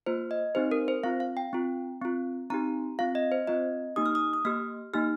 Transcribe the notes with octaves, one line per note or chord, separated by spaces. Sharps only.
A#3 F4 C5
D#5
C4 D#4 G4 C5
A#4
C5
C4 F4 F5
F5
G5
C4 F4
C4 F4
C4 D#4 G4 A#5
C4 F4 F5
D#5
C5
C4 F4 D#5
A#3 D#4 G4 D#6
F6
D#6
D#6
A#3 G4 F6
A#3 D#4 G4 F6